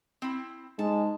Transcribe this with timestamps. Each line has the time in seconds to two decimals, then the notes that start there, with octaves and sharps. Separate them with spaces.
0.22 C4 E4
0.79 G#2 G#3 A5